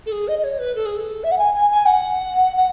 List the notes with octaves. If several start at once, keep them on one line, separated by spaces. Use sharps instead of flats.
A4
G#4
D#5
D#5
C#5
B4
A4
G#4
A4
E5
F#5
G#5
G#5
G#5
F#5
F#5